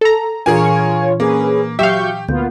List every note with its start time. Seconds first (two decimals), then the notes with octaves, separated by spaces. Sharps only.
0.01 A4 A#5
0.46 A#2 E3 D4 F4 G#4 A#4 C#5 G#5
1.20 A#3 C#4 G#4 B4
1.79 F#3 G4 E5 F5 C#6 G6
2.29 D2 A#3 B3 F4 G6